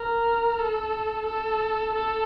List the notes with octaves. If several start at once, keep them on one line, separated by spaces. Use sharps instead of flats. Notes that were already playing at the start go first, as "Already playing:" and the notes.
Already playing: A#4
A4
A4
A4